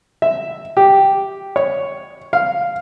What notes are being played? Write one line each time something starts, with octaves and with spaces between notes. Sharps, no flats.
E5
G4
C#5
F5